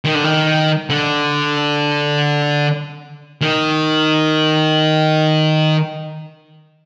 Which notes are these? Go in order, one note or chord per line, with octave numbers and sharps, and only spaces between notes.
D#3
D3
D#3
D3
D#3